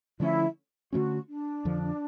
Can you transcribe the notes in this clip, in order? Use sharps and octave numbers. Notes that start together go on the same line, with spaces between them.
D3 F3 A3 C#4 E4
D3 F3 A3 C#4 F#4
D4
F2 D3 F3